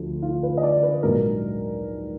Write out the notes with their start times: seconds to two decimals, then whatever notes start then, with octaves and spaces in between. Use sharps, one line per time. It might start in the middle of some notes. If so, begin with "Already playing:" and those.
Already playing: D2 D3 F3
0.22 F4
0.43 B4
0.57 D#5
0.63 D5
0.83 B4
1.03 A#1 G#2 F#3 A#4